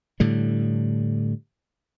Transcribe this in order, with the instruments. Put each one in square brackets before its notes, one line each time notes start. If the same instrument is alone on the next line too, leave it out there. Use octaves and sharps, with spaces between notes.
[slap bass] A2 D3 G3